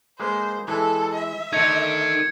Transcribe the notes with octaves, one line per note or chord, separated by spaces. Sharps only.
G#3 A#3 B4 C5
E3 G#3 E4 A4
E5
D3 A3 D#4 A#4 G#6 C#7